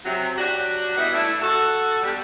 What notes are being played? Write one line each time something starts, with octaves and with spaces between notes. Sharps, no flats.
C3 F#3
F#3 D4 F#4 G4
G3 B3 E4 F#4 D#5
A3 D4 E4
F#4 A4
B2 D3 G3